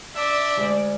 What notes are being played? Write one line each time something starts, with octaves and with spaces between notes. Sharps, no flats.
D4 D5 E5
D2 G3 G#3